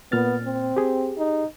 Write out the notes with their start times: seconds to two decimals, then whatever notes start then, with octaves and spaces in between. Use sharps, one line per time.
0.12 A#2 B3 F6 A6
0.44 C4
0.76 G4 G#4
1.18 D#4